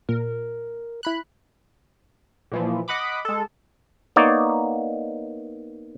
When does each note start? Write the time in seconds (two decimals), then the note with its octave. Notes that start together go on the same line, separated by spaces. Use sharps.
0.09 A#2 A#4
1.03 E4 B5 F#6
2.52 A#2 E3 F3
2.88 D#5 F#5 B5 D6
3.25 G#3 A4
4.16 A#3 B3 D#4 C#5 D5